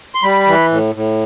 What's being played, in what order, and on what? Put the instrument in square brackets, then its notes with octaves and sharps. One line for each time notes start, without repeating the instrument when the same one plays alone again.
[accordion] C6
G3 B5
E3
A2
A2